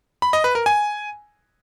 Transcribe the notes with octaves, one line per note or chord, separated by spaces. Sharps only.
B5
D#5
B4
A#4
G#5